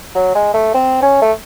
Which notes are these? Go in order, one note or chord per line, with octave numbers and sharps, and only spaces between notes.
F#3
G#3
A3
C4
C#4
A3